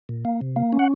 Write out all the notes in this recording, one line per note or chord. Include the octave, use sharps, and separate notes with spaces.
A#2
A#3
C3
A#3
C#4
F#5